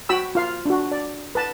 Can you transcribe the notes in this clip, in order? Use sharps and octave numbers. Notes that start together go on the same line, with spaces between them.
F#4 G5 B5 E6
F4 F5
D4 F#4
D5
B4 A5